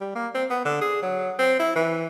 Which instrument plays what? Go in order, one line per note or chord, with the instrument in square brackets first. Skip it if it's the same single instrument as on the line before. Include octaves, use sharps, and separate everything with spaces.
[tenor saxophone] G3
A#3
C4
B3
D3
G#4
F#3
C4
E4
E3